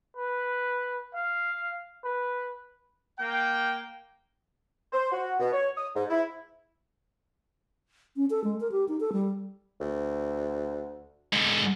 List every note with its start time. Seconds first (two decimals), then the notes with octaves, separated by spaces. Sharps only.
0.17 B4
1.14 F5
2.04 B4
3.19 A#3 G5
4.92 C5
5.12 F#4
5.40 B2
5.53 C#5
5.77 D#6
5.94 G#2
6.10 E4
8.17 C#4
8.30 A4
8.44 G#3
8.60 A#4
8.72 G4
8.88 D#4
9.00 A4
9.13 G3
9.80 D2
11.33 G#2 D3